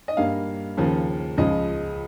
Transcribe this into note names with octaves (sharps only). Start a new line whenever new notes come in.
D#5
G2 G3 A#3 F5
D#2 C#3 F3 A#3
C#2 C#3 F3 G#3 D#5